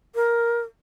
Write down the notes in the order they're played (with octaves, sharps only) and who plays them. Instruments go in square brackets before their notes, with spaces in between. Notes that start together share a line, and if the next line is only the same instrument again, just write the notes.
[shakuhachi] A#4